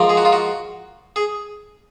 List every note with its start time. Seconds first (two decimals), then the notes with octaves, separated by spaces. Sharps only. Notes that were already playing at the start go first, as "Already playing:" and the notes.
Already playing: G#2 F3 A#3
0.09 G#4
0.17 F#4
0.25 F4
0.32 F#4
1.16 G#4